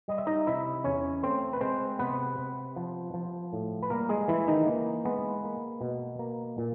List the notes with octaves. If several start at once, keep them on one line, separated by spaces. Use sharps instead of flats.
G3 D#5
E5
D#4 D#5
C3 E4 E5
E2 C#4 C#5
A3 C4 C5
B4
G#3 C4 C5
C3 B3 B4
C3
F3
F3
A2
B4
G3 A#3 A#4
G#3 G#4
E3 E4
D#3 D#4
E3 A#3
G#3 B3
A#3
B2
A#3
A#2